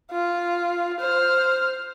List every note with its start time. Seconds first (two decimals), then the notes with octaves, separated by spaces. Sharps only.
0.11 F4
1.00 C5 F6